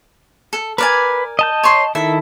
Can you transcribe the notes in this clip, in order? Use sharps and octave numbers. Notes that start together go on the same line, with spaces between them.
A4
A#4 B4 D5 G#5
D#5 A5 G6
C#5 C6
D#3 E4 A4 E5